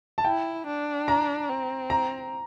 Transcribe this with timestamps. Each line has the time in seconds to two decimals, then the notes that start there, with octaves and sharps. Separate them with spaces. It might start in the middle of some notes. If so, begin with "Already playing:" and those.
0.18 A5
0.24 E4 G5
0.66 D4
1.08 A#5
1.49 C4
1.90 A#5